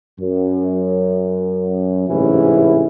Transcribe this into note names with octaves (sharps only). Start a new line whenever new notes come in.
F#2
A1 G#2 C3 E3 C#4 E4